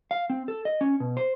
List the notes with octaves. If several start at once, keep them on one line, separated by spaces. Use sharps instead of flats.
F5
C4
A4
D#5
C#4
B2
C5